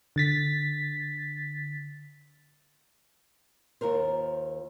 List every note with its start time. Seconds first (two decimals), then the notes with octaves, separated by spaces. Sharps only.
0.16 D3 A6 B6
3.81 D#2 F4 A#4 C5